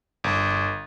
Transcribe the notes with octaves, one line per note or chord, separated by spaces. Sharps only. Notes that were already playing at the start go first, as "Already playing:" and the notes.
G1